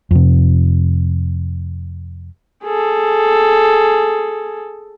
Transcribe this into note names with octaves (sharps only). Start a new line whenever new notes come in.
F2 C3
G#4 A4